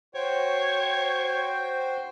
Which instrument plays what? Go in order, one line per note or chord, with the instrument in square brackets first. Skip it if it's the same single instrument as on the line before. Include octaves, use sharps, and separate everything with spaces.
[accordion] F#4 C5 G5 [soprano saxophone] C#5